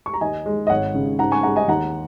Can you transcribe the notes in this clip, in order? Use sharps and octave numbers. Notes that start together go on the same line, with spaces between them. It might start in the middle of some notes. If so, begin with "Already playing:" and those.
C#6
A#5
D#2 D#5 G#5
G#3
D#5
G#1 C#5 F#5
C#3
G#2 F#5 A#5
G#5 C#6
G#3 F#5 A#5
D#5 G#5
D#2 F#5 A#5